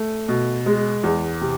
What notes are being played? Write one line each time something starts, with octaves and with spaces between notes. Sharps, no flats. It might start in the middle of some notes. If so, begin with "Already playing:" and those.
Already playing: A3
B2
G#3
E2
C3